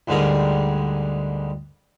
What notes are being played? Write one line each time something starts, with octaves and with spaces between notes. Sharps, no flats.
D2 G#2 D3 G3 G#4 A#4